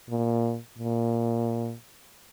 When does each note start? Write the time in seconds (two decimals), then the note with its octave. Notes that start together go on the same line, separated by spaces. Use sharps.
0.10 A#2
0.78 A#2